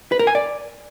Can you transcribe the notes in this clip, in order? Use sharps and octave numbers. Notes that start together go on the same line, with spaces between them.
B4
A#4
G#5
D5